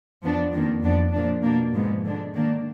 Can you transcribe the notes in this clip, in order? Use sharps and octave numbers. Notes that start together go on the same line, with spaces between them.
F2 F3 B3 D4
F2 D#3 A#3 D4
F2 F3 B3 D4
A#2 F3 A#3 D4
B2 A#3 D4
G#2 F3 G#3 B3
D3 G#3 D4
D#3 A#3 D4